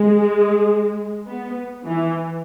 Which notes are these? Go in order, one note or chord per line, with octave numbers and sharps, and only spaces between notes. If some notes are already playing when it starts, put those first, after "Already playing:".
Already playing: G#3
B3
E3